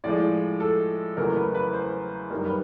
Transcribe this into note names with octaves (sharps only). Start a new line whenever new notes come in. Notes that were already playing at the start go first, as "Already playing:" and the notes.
A2 F3 G#3 D5
A4
E2 C#3 F#3 A3 A#4
B4
B4
C5
F#2 D#3 G3 A#4
B4